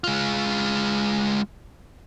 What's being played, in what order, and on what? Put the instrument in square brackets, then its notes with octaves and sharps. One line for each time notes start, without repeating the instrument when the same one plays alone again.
[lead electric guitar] G#3 F4